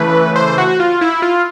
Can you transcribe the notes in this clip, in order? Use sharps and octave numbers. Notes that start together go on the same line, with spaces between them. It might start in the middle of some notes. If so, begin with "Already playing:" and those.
Already playing: C#3 E3 A3 B4
C5
F#4
F4
E4
F4